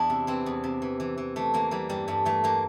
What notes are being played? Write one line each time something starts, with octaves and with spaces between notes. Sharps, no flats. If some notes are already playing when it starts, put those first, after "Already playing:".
Already playing: E2 D4 E4
C3
E3 C4
E2
C3
E3
E3
E3
E3 A3
E3 A#3
E3 G3
G2 G3
G2 A3
E3 A3
E3 A#3